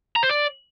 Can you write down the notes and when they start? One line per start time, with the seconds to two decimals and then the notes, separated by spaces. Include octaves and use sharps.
0.16 A#5
0.23 C5
0.30 D5